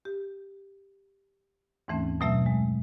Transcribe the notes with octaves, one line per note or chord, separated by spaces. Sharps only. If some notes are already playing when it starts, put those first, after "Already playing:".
G4
D#2 G#2 E3 A3 C4 C#4
F#2 B2 F#3 A3 E5 E6
G#3